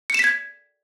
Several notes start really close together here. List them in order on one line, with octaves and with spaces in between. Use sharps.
C#7 E7 B6 G#6